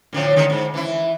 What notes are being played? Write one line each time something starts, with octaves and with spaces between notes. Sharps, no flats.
A2 D3 F3
D3 D#3 G#3
G#2
E3 E4